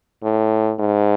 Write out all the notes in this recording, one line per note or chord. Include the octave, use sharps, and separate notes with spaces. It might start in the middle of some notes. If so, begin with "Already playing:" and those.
A2
G#2